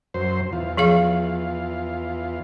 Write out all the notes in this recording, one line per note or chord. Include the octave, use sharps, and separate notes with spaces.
F#2 C5
E2 F4
F3 G#4 F5